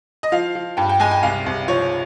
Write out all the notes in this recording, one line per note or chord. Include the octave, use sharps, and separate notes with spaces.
D#5
F3 F5
F3
G2 G5
G5
G#3 G#5
G5
C2 F5
C2
F3 C#5